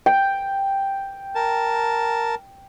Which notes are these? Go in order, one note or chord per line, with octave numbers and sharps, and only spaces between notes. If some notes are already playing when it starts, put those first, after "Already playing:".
G5
A#4 A5